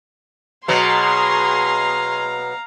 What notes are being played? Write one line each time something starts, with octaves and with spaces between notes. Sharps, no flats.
B2 F#3 G#4 F5 A#5 C6